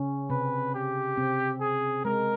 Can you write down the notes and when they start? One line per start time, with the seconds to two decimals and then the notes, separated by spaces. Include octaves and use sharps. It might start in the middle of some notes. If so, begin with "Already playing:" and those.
Already playing: C#3 C#4
0.30 C3 C4 B4
0.74 G4
1.17 C3 C4
1.61 G#4
2.05 G#3 A#4